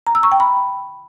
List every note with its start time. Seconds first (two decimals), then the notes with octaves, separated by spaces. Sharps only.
0.07 A#5
0.15 E6
0.23 C#6
0.32 G5
0.40 B5